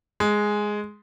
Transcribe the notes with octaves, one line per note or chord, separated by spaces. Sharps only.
G#3